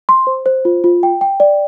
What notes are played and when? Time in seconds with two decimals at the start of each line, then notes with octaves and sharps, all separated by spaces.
0.09 C6
0.27 C5
0.46 C5
0.65 F4
0.84 F4
1.03 G5
1.21 G5
1.40 D5